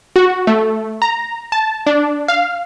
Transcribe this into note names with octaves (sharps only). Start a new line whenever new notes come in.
F#4
A3
A#5
A5
D4
F5